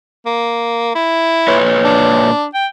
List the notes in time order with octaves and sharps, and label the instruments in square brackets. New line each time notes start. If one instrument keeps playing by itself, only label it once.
[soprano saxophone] A#3
E4
[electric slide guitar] A#2 B4 C#5
[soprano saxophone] D4
G5